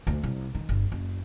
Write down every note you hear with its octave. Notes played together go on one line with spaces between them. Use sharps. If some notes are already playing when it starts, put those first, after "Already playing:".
D2
C2
D#3
G1
F#1